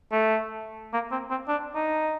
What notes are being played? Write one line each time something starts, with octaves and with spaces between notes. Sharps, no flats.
A3
A#3
C4
C4
D4
D#4